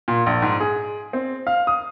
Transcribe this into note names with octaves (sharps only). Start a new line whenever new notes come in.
A#2
A#1
G#2
G#4
C4
F5
D#6